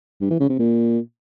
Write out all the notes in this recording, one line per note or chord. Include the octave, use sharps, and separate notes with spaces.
G2
E3
C#3
C3
A#2